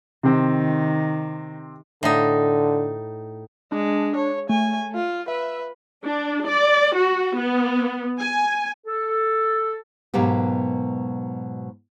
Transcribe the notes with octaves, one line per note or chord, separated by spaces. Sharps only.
C3 D#3 C4
A2 D3 D#4
G#3 D4
C#5
A3 G#5
F4
B4 E5
D4
D5
F#4
B3
G#5
A4
G#2 B2 F#3 A#3 B3 G4